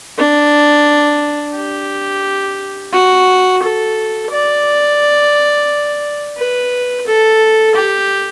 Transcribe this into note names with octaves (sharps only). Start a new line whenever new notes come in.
D4
G4
F#4
A4
D5
B4
A4
G4